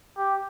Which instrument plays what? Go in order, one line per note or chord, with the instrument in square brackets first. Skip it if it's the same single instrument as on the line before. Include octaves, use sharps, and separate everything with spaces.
[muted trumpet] G4